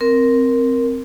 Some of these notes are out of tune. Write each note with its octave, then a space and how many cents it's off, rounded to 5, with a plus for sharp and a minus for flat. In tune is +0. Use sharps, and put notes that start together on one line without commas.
C4 +0 A#4 +0